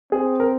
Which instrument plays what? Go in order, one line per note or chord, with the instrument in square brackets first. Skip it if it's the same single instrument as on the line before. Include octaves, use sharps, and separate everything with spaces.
[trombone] C4 [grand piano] G#4
[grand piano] A#4